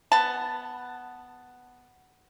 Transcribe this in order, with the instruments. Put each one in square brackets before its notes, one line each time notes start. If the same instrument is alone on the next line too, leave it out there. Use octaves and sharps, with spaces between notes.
[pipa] B3 A5